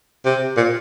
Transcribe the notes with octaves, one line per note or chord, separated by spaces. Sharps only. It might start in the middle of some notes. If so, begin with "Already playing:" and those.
C3
A#2